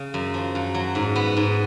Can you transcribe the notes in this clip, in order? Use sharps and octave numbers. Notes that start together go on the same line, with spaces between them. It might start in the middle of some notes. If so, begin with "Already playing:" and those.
Already playing: C#3
F#2
F3
F#2
F#3
G#2
B3
G#2